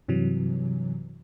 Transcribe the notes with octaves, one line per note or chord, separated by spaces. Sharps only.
G2 C3 E3 F#3